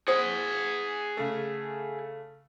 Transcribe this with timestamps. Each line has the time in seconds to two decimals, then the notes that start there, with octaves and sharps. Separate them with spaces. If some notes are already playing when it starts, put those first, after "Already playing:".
0.08 G#4 C5 F#5 D#6
1.17 C#3 A3